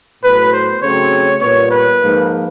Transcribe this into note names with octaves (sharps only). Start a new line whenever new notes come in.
A2 F#3 B3 B4
C5
C#3 F#3 A3 C4 C#5
A#2 G3 B3 C#5
B4
G#2 F3 A#3